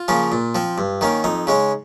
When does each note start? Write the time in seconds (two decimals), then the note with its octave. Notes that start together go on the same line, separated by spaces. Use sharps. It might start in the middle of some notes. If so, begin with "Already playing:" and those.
Already playing: F4
0.08 C#3 F3 A#3 C#4
0.32 A#2
0.55 F3 C4
0.78 G2
1.01 D#3 A#3 C#4
1.24 F2 D#4
1.47 C#3 G#3 C#4